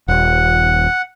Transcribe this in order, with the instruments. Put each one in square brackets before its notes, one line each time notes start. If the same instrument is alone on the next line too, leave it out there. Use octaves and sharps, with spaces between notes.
[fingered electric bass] D#1 [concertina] F#5